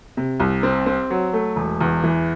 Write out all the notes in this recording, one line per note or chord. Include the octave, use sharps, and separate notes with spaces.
C3
C2
C4
C4
F#3
A3
E1
E2
E3